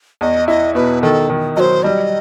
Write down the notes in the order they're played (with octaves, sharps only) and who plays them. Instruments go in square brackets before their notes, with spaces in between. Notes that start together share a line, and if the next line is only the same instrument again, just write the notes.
[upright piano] E2 [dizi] D#5
[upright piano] E4 [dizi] D#5
[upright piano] B2 [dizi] B4
[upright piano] D#3 [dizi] A4
[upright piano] D#3
[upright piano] F#3 [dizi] C5 D#5
[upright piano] G3 [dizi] D#5